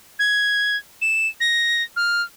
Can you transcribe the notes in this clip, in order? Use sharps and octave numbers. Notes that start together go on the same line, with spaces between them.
G#6
E7
A#6
F6